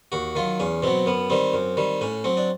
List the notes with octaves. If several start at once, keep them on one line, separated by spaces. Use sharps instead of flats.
D#2 F#4
D#3 F#3 F4
E2 C#4
B2 F#3 C4
F#2 B3
D#3 G3 C4
F#2
D#3 G3
A2 C#4
F#3 C4
D4